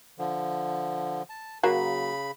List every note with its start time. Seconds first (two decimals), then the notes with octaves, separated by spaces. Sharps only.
0.18 D3 F3
1.30 A5
1.63 C#3 F#3 A#3 F#4 B5